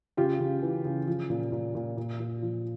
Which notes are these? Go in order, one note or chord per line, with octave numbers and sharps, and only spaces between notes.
C#3 F4 G4
C#3
E3
C#3
F3
A#2
A#2
A#2
A#2
A#2
F3